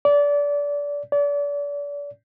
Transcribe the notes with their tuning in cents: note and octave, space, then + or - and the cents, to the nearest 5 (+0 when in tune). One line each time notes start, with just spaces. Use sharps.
D5 -25
D5 -35